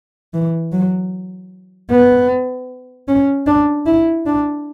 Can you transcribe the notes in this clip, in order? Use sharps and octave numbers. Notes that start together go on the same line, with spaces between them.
E3
F#3
B3
C#4
D4
E4
D4